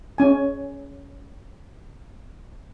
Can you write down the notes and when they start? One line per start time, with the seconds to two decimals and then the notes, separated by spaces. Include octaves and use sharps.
0.18 C#4 G#5